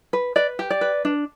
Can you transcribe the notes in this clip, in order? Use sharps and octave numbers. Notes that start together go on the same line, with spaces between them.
B4
B4 D5
G4
D5
B4
D4